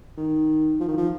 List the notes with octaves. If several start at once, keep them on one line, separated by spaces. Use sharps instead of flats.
D#3
F3
D#3
F3